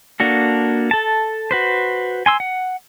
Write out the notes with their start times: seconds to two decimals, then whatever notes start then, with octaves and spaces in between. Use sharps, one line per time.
0.20 A#3 D4 F#4 A4
0.91 A4 A5
1.51 F#4 B4 C5
2.26 G#5 C6 E6
2.40 F#5